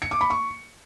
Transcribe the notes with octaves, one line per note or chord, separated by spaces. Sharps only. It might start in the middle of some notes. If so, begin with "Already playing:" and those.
C#7
D6
B5
C#6